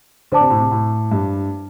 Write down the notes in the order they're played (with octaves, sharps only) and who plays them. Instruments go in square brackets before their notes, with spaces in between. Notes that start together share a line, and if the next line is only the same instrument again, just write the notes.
[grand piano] D3 [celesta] C5 A5 D6
[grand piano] C3
A2
C3
A2
G2